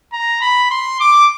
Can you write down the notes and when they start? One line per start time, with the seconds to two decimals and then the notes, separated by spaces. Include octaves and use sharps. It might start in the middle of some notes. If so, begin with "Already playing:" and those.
0.13 A#5
0.41 B5
0.70 C6
1.00 D6